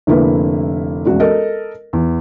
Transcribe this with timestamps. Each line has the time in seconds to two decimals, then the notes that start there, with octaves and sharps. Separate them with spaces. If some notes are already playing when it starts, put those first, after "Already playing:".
0.07 F1 D3 A#3 E4 B4
1.06 E1 A1 F#4
1.20 A4 A#4 D#5
1.93 E2